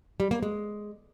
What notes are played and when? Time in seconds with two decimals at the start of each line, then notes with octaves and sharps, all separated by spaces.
0.20 G3
0.31 A#3
0.42 G#3